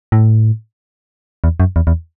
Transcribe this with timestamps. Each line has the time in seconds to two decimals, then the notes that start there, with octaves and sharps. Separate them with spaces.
0.12 A2
1.44 E2
1.60 F#2
1.76 E2
1.87 E2